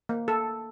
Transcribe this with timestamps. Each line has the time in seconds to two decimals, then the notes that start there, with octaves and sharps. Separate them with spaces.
0.09 A#3
0.28 A4